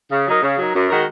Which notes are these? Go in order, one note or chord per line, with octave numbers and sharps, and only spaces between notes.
C#3
F#3 D#4 A#4
C#3
F#3 D#4 A#4
F#2
D#3 G#3 F#4 A#4